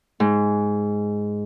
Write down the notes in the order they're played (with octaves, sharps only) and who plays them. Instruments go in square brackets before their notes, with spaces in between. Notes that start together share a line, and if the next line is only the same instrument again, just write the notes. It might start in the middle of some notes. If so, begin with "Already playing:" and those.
[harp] G#2